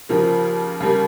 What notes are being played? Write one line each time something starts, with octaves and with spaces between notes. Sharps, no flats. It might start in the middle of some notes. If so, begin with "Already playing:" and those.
D#2 C#3 F3 A#3
D#2 C#3 G3 A#3